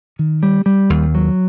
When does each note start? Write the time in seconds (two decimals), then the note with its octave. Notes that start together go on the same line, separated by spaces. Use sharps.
0.19 D#3
0.43 G3
0.66 G3
0.90 D#2
1.15 F#3